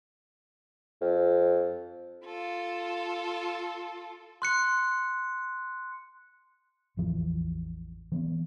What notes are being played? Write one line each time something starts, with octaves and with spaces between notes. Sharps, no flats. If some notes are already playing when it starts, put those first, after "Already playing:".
F2
F4 A4
C6 F#6 C#7
A1 E2 E3 F3
E3 B3 C4